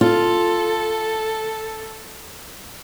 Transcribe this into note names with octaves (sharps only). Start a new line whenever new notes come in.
F4 A4